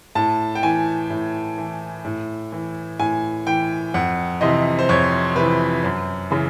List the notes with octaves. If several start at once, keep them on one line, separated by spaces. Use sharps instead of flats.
A2 A5
G5
E3 G#5
A2
E3
A2
E3
A2 G#5
E3 G5
F2 F#5
C3 E3 D#5
C5
F2 C#5
C3 E3 B4
F#2
C#3 E3